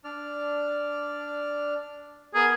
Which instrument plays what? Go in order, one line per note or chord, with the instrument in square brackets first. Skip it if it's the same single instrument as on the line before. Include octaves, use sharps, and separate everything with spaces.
[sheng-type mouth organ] D4 D5 F6
[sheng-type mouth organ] B3 A#4 [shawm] G#4